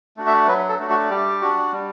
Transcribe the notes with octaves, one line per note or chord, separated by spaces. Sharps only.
A3 D4 F#4
E5
F#3 B4
A4
A3 D4 F#4
F#4
G3 G4
D4 F#4
G3